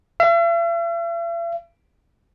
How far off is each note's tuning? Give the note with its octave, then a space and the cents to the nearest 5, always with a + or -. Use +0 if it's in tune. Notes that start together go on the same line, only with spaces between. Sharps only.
E5 +45